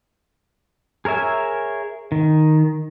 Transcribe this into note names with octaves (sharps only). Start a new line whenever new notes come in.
G#4 A#4 C#5 E5 G#5
D#3